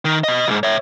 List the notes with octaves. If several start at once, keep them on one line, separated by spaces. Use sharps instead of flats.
D#3
B2 D#5
B1 G#2
C#5 E5